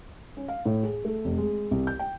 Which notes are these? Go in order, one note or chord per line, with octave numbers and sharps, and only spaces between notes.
C#4
F5
A2
G#4
A3
F1
G#3
C2
G6
G5